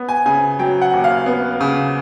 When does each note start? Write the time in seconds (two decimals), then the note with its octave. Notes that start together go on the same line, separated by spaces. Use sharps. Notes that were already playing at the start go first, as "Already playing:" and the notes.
Already playing: B3
0.09 G#5
0.26 C#3 G#5
0.59 F#3 G5
0.82 F#5
0.93 D#2
1.04 F5
1.26 B3
1.61 C#3